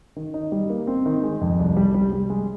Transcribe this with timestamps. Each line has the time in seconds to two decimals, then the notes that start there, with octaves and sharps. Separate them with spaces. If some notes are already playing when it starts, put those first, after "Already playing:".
0.16 D#3
0.34 D#4
0.52 G3
0.70 A#3
0.87 C4
1.06 D#3
1.23 G#3
1.41 F2
1.59 C2
1.77 G3
1.94 G3
2.12 G3
2.30 G#3